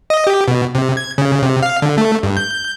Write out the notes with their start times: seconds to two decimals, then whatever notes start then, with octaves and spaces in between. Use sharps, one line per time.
0.10 D#5
0.27 G4
0.48 B2
0.75 C3
0.97 G#6
1.18 C#3
1.42 C3
1.63 F5
1.82 D3
1.98 A3
2.23 G2
2.37 G6